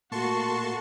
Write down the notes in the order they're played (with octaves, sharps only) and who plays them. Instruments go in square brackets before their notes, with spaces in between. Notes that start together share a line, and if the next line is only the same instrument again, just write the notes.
[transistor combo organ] A#2 A3 A#3 [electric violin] F#4 [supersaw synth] A5 C6 C#6